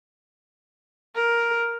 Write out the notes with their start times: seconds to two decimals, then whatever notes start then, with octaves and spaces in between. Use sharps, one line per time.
1.15 A#4